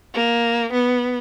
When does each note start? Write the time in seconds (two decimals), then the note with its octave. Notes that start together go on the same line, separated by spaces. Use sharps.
0.14 A#3
0.72 B3